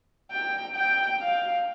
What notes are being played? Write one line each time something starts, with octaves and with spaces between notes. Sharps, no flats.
G5
G5
F5